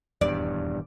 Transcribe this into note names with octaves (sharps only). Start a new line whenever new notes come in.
D#1 E2 G2 D5